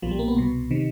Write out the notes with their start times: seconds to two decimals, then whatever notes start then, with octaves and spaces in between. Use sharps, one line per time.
0.02 B1 A#2 F3
0.11 G3
0.19 A#3
0.28 B3
0.36 C2 B2
0.71 C3 D#3